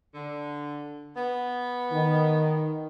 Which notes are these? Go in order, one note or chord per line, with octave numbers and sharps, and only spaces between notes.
D3
B3
D#3